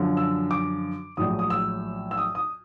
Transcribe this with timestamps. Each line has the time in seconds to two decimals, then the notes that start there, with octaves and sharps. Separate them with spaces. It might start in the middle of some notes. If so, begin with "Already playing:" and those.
Already playing: F#2 D3 F3
0.17 E6
0.51 D6
1.17 A#1 A2 F#3 D#6
1.39 D#6
1.50 E6
2.11 E6
2.18 D#6
2.35 D#6